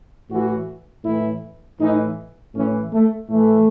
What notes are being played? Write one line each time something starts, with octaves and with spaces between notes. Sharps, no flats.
A2 E3 F#4
A2 E3 E4
A2 E3 D#4
A2 E3 C#4
A3
A2 E3 A3